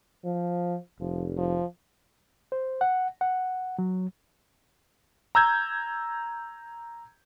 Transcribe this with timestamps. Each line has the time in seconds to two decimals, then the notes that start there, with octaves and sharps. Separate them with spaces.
0.25 F3
1.00 F1 F3
1.37 F3
2.52 C5
2.81 F#5
3.21 F#5
3.79 F#3
5.35 A#5 E6 G6 G#6